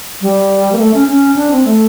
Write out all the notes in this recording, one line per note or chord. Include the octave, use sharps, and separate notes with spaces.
G3
A#3
A3
C#4
C#4
D4
C4
A3